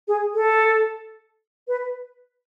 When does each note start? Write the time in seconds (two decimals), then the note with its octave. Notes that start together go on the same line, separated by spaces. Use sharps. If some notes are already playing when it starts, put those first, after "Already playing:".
0.08 G#4
0.34 A4
1.68 B4